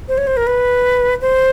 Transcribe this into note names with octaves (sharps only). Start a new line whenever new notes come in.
C5
C#5
C5
A#4
B4
C5